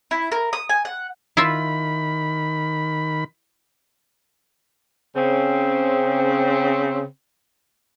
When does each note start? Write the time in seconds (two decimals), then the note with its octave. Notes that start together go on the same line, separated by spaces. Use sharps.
0.11 E4
0.32 A#4
0.53 D#6
0.69 G#5
0.85 F#5
1.37 D#3 E4 F4 E5 B5
5.15 C#3 C4